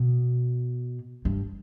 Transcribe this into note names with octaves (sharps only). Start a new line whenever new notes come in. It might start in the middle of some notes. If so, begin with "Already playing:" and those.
Already playing: B2
G2